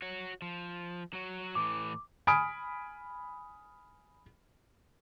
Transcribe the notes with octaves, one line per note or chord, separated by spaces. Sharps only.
F#4 C#5
F3
F#3 F#4
A2 E3 D6
G#5 B5 D#6 F6 D7